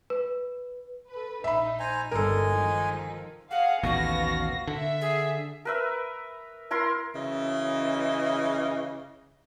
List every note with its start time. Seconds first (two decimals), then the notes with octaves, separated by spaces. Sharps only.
0.10 B4
1.09 A4 B4
1.44 A#1 D#4 E5 B5
1.80 C5 G#5 A#5
2.11 G1 C2 G#3 A4 A#4 G#5
2.49 D#3 F3 D#4
3.51 G#4 F5 F#5
3.83 A1 D#2 B2 B3 F#4 F5 A#6
4.68 D3 E5
5.01 G#4
5.65 A#4 B4 E5
6.71 E4 A#4 C6
7.15 F#2 C#3 E3 D#5